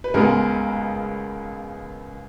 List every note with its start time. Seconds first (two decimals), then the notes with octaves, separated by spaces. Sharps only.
0.04 B4
0.14 C#2 C#3 G#3 B3 A#4